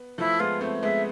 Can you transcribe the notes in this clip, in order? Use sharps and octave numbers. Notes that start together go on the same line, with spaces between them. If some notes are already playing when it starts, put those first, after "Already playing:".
Already playing: B3
F3 A3 E4
G#3 B3 F4
A3 C4
G#3 B3 E5